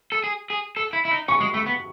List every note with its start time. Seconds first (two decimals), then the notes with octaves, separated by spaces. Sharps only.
0.12 A4
0.24 G#4
0.50 G#4
0.77 A4
0.93 E4
1.05 E4
1.11 D#4
1.28 C#4 C#6
1.40 G#3
1.54 A3
1.66 B3